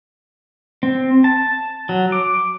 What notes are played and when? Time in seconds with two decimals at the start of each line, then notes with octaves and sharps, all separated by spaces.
0.83 C4
1.24 A5
1.89 F#3
2.12 D6